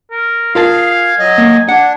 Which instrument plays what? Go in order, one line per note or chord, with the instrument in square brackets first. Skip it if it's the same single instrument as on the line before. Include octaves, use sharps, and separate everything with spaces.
[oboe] A#4
[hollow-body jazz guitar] F4 A#4 A5 [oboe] G#4 [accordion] F5
[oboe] G#5
[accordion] F#3 D#5
[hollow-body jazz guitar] A#3
[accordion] D4 [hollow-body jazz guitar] F#5